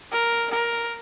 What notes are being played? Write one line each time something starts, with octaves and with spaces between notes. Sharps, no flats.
A#4
A#4